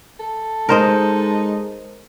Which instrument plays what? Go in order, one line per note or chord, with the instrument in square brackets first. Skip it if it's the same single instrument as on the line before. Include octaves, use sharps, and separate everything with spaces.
[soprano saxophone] A4
[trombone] G#3 [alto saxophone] D#4 [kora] A#4 C5 D#5